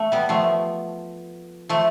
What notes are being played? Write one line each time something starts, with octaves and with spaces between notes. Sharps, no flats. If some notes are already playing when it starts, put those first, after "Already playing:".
Already playing: A3
G3 B3
F3 A3
F3 A3